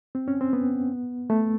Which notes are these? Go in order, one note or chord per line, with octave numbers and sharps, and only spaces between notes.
C4
C#4
C4
B3
A3